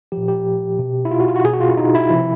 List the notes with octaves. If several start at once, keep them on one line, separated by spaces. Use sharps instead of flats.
F3 G4
A#2
G4
B2
E4
F4
F#4
F4
F#4
B2 G#4
F#4
F4
E4
D#4
E4
C3 F3